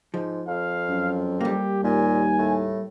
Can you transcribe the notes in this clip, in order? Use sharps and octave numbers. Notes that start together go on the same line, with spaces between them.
G#2 F3
F2 F5
F#2
G3 A#3 G4
D#2 A#2 G#5
A2